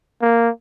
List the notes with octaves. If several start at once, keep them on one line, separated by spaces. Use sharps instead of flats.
A#3